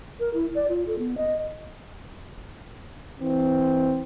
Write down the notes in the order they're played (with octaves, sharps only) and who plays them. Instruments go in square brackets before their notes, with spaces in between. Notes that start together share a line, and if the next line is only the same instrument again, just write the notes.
[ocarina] A#4
E4
D5
F4
A4
B3
D#5
[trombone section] E3 C4